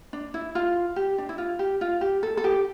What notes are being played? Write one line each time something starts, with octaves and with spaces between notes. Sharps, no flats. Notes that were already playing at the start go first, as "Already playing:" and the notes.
D4
E4
F4
G4
D4
E4
F4
G4
F4
G4
A4
A4
G4